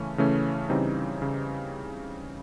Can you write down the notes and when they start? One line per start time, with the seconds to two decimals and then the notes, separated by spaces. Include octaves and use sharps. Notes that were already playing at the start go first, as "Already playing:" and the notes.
Already playing: C#3 E3 A3 C#4
0.18 C#3 E3 A3 C#4
0.69 C#3 E3 G3 C4 D#4
1.22 C#3